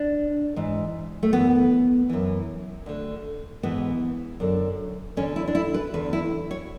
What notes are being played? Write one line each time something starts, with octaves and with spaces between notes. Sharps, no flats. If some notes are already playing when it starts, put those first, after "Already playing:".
Already playing: D4
G#2 E3
A3
F#2 E3 B3
F#2 E3
D2 D3
G#2 E3 B3
F#2 D3
E2 D3 C#4
E4
D4
E4
B4
E2 D3 B4
E4
C#5